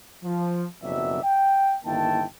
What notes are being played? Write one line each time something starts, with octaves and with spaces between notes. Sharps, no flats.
F3
F#1 F2 B2 F#3 D5 E5
G5
G1 D#3 A#3 E4 G5 A5